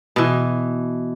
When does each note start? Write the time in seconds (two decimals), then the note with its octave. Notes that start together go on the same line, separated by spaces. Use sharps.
0.16 B2 E3